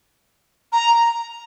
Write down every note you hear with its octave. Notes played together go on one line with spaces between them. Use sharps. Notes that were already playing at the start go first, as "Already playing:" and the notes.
A#5